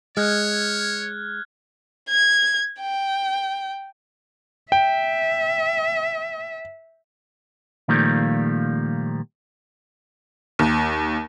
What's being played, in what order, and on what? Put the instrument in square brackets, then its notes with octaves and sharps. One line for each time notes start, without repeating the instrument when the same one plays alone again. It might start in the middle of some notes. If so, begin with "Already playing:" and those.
[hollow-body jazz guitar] G#3 [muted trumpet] C#5 [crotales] F6 F#6 G#6
[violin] G#6
G5
[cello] E5 [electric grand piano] G5
[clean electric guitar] A#2 D#3 F3 G3 A3 A#3
[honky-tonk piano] D#2